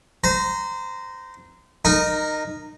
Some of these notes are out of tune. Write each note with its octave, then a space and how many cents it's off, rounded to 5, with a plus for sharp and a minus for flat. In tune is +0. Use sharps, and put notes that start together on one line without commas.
C5 -25 A#5 +0
D#4 -20 A#4 +0